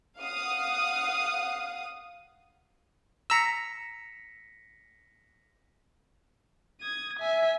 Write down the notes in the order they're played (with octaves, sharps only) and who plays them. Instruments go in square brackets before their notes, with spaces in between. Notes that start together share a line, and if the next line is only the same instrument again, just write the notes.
[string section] F5 F#5 D#6
[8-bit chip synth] A#5 E6 [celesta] A#6 B6 C#7
[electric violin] D#6 G#6
E5 G#5